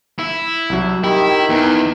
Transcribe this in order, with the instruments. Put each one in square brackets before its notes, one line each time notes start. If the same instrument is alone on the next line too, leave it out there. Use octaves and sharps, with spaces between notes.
[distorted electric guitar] E4
[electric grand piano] C2 F#3
[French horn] D#3 [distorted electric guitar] E4 [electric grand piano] G4
[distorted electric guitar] E2 [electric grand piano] E3 D#4